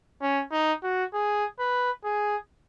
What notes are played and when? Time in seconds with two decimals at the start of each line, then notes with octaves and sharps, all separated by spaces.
0.22 C#4
0.52 D#4
0.83 F#4
1.13 G#4
1.59 B4
2.04 G#4